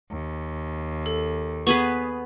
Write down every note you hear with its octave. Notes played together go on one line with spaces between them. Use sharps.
D#2
A4
B3 G#4 B4 C#6